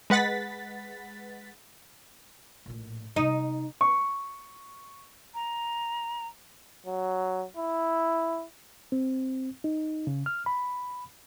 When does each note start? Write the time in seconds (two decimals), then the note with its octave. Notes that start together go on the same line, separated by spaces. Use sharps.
0.10 G#3 B4 F#5 A6 B6
2.66 A#1 A2
3.16 C3 B3 D#4
3.81 C#6
5.34 A#5
6.86 F#3
7.57 E4
8.92 C4
9.64 D#4
10.07 C#3
10.26 F6
10.46 B5